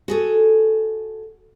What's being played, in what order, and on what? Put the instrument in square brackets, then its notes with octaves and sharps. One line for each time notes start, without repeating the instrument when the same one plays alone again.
[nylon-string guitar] F#4 G#4 A4